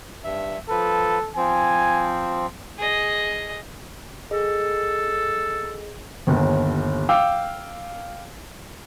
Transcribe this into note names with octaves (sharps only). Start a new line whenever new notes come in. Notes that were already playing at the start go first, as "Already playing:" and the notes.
G2 E5
F3 A4 B4
F3 C4 G#5
G#4 D#5
G#4 A4 D#5
G1 D#2
F5 G5 D6 E6